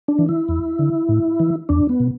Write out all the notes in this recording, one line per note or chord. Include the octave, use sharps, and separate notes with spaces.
D4
E3
E4
E2
D3
A2
E3
E2 D4
B3
B2